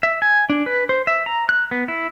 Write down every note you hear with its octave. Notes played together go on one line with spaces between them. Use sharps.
E5
G#5
D4
B4
C5
E5
A#5
F#6
B3
E4